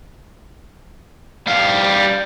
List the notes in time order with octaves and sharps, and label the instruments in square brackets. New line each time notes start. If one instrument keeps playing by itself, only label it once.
[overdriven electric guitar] G3 F5